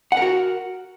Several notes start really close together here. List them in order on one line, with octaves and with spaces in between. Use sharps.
F#5 A#4 F#4